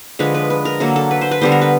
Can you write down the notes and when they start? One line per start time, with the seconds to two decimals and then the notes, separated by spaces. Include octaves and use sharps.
0.19 D3 F3 G#3 B4
0.34 B4
0.50 B4
0.65 A#4
0.80 D3 F#3 A#3 A4
0.96 A4
1.11 B4
1.21 C5
1.31 B4
1.41 D3 G3 B3 C5
1.52 A#4
1.62 B4